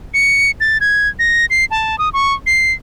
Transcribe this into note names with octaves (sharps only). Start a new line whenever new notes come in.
C#7
A6
G#6
A#6
C7
A5
D#6
C#6
C7